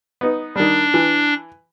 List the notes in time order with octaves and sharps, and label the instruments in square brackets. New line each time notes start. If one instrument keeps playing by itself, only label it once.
[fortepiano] B3 D#4
[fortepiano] D#3 G3 [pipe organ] D4
[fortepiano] E3